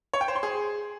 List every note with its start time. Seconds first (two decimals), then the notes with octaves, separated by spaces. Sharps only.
0.14 C#5
0.21 G5
0.28 C5
0.36 C6
0.43 G#4